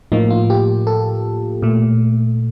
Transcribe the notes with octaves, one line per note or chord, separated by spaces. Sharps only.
A2 F3 A#3 D#4
F4
G4
A4
A#2 A3